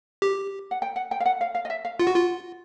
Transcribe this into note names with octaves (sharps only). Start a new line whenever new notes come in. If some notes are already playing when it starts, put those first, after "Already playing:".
G4
F#5
G5
F#5
G5
F5
F#5
F5
F5
D#5
E5
F5
F4 F#5
F#4
F4